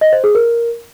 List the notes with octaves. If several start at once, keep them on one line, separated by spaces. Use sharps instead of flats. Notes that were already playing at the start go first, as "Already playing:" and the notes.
D#5
C5
G#4
A#4